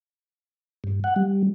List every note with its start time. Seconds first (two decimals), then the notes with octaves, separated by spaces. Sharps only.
0.84 G2
1.04 F#5
1.16 G3